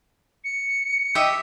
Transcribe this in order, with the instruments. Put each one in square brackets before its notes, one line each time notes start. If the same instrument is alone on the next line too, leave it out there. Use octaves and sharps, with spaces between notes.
[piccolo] C#7
[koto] G4 D#5 E5